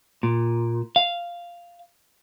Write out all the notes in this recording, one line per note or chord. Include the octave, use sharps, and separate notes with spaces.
A#2
F5